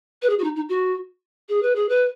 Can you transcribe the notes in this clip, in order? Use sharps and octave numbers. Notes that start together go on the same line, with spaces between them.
B4
G#4
F#4
D#4
D#4
F#4
G#4
B4
G#4
B4